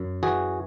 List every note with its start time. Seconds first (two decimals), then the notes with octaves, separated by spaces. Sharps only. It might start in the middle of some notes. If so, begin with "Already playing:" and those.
Already playing: F#2
0.23 E3 F#4 G#4